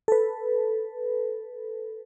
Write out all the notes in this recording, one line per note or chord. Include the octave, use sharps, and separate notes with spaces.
A4 B4